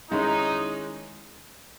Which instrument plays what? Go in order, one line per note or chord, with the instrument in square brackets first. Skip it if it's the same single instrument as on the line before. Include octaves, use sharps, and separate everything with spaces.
[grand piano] D#3 G#3 C#4 E4 [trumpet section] D#4